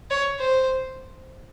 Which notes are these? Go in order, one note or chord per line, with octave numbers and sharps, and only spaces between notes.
C#5
C5